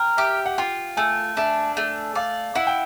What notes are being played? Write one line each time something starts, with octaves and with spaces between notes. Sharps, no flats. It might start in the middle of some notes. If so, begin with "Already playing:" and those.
Already playing: A#4 G5
G4 E5
F#5
F4 G5
A3 G#5
D4 E5
A3
D5 F5
E4 F#5
G5